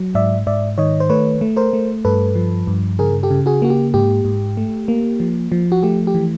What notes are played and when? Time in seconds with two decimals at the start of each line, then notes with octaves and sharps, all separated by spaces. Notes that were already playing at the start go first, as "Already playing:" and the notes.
Already playing: F#3
0.15 G#2 D5 E5
0.47 G#2 D5 E5
0.78 D#3 C#5 D#5
1.00 C5
1.10 A3 B4 C#5
1.41 A3
1.57 A#4 C5
1.73 A3
2.05 G2 A4 B4
2.35 F3
2.67 G2
2.99 C#3 G#4 A#4
3.23 G4 A4
3.31 C#3
3.46 F#4 G#4
3.62 A#3 F#4
3.70 G4
3.94 G#2 G4
4.25 G#2
4.57 A3
4.88 A#3
5.20 F3
5.52 F3
5.72 F#4
5.83 A3 G4
6.07 G4
6.14 E3